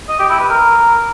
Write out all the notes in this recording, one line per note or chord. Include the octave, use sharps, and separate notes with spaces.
D#5
G4
E4
B4
A#4